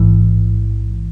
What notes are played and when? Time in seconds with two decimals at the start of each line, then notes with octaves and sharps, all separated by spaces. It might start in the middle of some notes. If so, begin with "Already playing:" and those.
Already playing: A1 G#2 E3